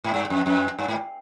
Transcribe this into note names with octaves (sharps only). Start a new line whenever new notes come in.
G#2
G2
F2
F2
G2
G#2